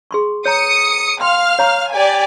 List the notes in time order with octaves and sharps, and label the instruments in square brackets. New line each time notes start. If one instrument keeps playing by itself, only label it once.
[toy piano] G#4 C6 C#6
[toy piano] C#5 A#5 [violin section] D#6 C#7
[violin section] F5 F6 [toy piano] G5 C6
[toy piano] C#5 A#5 C#6
[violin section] G4 D5 G#5